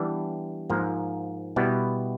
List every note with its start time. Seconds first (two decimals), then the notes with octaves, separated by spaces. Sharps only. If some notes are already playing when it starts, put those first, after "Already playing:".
Already playing: E3 G3 B3 D4
0.70 G#2 F3 A#3
1.56 B2 G3 B3 E4